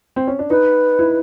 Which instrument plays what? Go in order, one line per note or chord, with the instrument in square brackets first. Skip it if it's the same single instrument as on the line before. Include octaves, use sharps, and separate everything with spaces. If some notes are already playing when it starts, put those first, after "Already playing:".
[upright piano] C4
C#4
D4
[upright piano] D#4 [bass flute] B4
[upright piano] E4